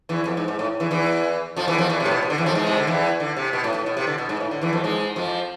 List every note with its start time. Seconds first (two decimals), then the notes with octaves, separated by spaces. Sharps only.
0.09 E2 E3
0.25 F2
0.37 G#2
0.48 G#2
0.59 A2
0.80 E2 E3
0.91 E2 E3
1.56 F2 F3
1.68 E2 E3
1.78 F2 F3
1.89 E2 E3
2.00 C3
2.06 A2
2.11 B2
2.22 C3
2.30 D3
2.38 E2 E3
2.46 F2 F3
2.55 G#2 G#3
2.67 C3
2.77 D3
2.87 E2 E3
3.20 D3
3.36 C3
3.53 B2
3.64 A2
3.74 A2
3.86 B2
3.97 C3
4.07 D3
4.18 B2
4.29 G#2
4.40 A2
4.51 D3
4.61 E2 E3
4.73 F2 F3
4.84 G#2 G#3
5.16 F2 F3